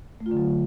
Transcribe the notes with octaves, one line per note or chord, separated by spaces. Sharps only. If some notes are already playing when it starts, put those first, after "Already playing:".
A3
F4
D3
F#3